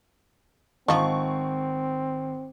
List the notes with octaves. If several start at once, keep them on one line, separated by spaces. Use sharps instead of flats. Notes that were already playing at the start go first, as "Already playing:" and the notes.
G#1 F3 C4 D#4 C#6